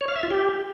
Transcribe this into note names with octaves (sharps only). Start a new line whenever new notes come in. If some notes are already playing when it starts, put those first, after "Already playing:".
C#5
F5
E5
F4
G4